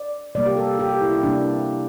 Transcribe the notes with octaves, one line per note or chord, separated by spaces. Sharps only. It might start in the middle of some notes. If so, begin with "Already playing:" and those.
Already playing: D5
C3 G3 A#3 D5
G4
A4
G4
E4
E4
C3 G3 A#3 D4